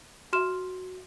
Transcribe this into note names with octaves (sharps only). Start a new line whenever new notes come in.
F#4 E5 C6 F6 E7